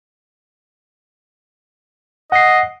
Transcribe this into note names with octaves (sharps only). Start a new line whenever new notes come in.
D#5 F#5 C7